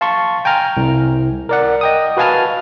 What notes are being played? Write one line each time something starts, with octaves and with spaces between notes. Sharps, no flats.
F5 A5 C6 C#6
G5 G#5 A#5 F6
C2
A#4 D5 F#5
D#5 G5 D#6
F#4 B4 F5 G#5 A5 F6